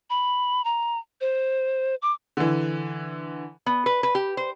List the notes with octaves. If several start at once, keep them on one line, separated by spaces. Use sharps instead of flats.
B5
A#5
C5
D6
D3 E3
B3
B4
B4
G4
C5